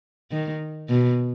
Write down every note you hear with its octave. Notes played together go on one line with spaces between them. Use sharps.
D#3
B2